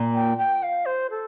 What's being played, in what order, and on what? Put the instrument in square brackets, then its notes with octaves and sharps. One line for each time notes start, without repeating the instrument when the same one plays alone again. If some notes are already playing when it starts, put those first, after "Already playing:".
Already playing: [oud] A#2
[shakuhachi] G5
G5
F5
C5
A4